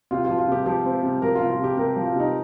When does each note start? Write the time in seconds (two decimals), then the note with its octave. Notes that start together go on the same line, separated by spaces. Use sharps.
0.11 C3 F4
0.25 F3 F4
0.38 F4
0.48 C3 G4
0.66 F3 G4
0.85 C4
1.03 C3
1.22 F3 A#4
1.35 C3 F4
1.50 F4
1.59 C3 G4
1.77 C3 A#4
1.96 F3
2.05 F4
2.15 C3 D#4